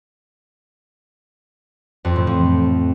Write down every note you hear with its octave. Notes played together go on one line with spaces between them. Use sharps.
F2
A2
F3